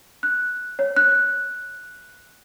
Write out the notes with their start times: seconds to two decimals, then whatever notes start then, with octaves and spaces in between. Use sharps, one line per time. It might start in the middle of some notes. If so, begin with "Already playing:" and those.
0.23 F#6
0.79 C#5
0.96 F#6